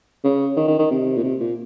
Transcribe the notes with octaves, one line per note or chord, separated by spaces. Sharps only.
C#3
D#3
D#3
D#3
C3
A#2
C3
A#2